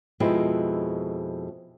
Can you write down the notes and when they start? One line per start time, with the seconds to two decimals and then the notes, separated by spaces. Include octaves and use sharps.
0.20 F2 B2 G#3 C4 E4